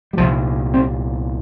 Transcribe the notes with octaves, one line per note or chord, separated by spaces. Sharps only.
G3
C2 A#2 F3
C4